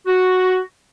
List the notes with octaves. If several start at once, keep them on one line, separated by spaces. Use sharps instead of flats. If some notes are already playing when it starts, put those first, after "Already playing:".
F#4